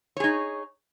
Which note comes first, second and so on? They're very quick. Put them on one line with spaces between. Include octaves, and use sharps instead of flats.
C#5 G#4 D#4